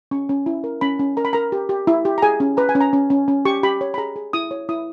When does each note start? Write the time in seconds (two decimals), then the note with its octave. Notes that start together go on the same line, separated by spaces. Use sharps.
0.11 C#4 C#6
0.29 C#4
0.46 E4
0.64 A#4
0.81 C#4 B5
0.99 C#4
1.17 A#4 A#5
1.25 B5
1.33 A#4 A#5
1.52 G4
1.69 G4
1.87 E4
2.05 G4
2.18 A#5
2.22 G#4 G#5
2.40 C#4
2.57 B4 A#5
2.69 G#5
2.75 C#4
2.81 A#5
2.93 C#4
3.10 C#4
3.28 C#4
3.45 G4 C#6
3.63 G4 B5
3.81 C#5
3.94 B5
3.98 G#4 A#5
4.16 G#4
4.33 E4 D#6
4.51 C#5
4.69 E4 D#6